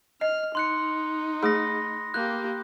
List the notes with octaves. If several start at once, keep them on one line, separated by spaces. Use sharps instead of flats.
D#5 F6
D#4 C6 F#6 C#7
A3 G#4 B5 D#6 A#6
A#3 G4 F#6 G6